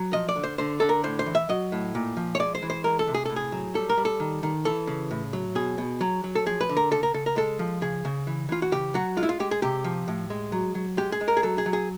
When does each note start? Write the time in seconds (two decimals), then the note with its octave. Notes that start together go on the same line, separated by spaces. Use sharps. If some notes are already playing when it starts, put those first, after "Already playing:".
Already playing: F#3
0.13 F3 D#5
0.29 D5
0.36 D3
0.44 C5
0.58 D3 C5
0.80 D3 A4
0.89 A#4
1.04 A2 C5
1.19 C5
1.26 E3
1.35 E5
1.49 F#3 D#5
1.72 A2
1.95 A#2
2.17 F3
2.35 C#5
2.40 G#3 D5
2.55 C5
2.62 E3
2.70 C5
2.84 G#3 A#4
2.99 A4
3.07 C3
3.14 G#4
3.25 A2 A4
3.36 G#4
3.52 F#3
3.75 G3 A4
3.90 A#4
3.97 G3
4.05 A4
4.20 D#3
4.43 D#3
4.65 E3 A4
4.87 C#3
5.11 A2
5.33 F#3
5.55 B2 G#4
5.78 B2
6.01 F#3
6.24 F#3
6.35 A4
6.46 F3 G#4
6.61 B4
6.69 D3
6.77 A#4
6.91 C#3 A4
7.03 A#4
7.14 C#3 A4
7.26 A#4
7.36 G#3 A4
7.59 F3
7.81 C#3 G#4
8.05 C#3
8.27 E3
8.49 E3 F4
8.62 F#4
8.72 C#3 G4
8.94 F#3 F#4
9.17 G#3 F4
9.23 E4
9.29 F4
9.40 G#3 G4
9.51 G#4
9.62 C3 G4
9.84 F3
10.08 A2
10.30 G#3
10.52 F#3
10.75 F#3
10.97 G#3 G4
11.12 G#4
11.21 G#3
11.28 A#4
11.37 G#4
11.43 F#3 A4
11.58 G#4
11.66 F#3
11.73 G#4